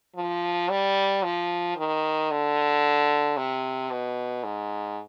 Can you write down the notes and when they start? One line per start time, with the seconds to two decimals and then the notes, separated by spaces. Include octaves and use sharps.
0.16 F3
0.70 G3
1.23 F3
1.77 D#3
2.31 D3
3.37 C3
3.91 B2
4.44 G#2